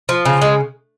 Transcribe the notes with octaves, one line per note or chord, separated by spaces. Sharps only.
F3
C#3
G#3